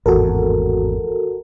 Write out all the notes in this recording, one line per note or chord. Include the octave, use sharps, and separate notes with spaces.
G#1 E2 A2 F#4 A4 A#4